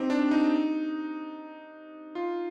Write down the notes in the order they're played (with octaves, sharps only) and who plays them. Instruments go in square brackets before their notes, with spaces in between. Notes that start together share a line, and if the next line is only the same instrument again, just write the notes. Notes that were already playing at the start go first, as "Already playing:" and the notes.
Already playing: [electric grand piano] C4 D#4 G4 C5
D4
D#4
F4